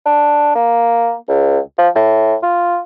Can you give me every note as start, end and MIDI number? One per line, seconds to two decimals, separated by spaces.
0.06 0.55 62
0.55 1.14 58
1.28 1.59 37
1.78 1.88 53
1.95 2.35 45
2.43 2.79 65